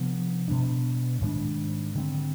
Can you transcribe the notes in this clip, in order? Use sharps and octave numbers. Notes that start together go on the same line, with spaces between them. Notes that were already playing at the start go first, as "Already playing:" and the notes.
Already playing: C3 F3 B3 D4
B2 G3 D4
G#2 D#3 G3 D4
D3 G3 C4